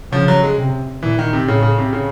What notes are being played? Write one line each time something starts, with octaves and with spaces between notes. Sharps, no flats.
C#3 F3
F#3
G#3
C3
A#2 E3
D#3
C3
A2 C#3
C#3
C3
C#3